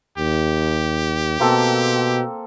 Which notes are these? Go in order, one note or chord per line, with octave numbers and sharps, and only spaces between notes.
D#2 G4
B2 A#3 C4 A4